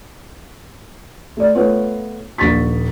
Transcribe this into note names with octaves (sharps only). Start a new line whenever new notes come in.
A3 D5
A3 B3 F4 B4 C#5
D#1 A#1 C#6 A6 B6